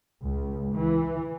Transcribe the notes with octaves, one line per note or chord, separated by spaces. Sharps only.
C#2
E3